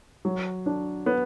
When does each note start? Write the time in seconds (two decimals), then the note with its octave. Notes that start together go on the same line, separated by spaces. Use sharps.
0.25 F#3
0.66 D4
1.06 B3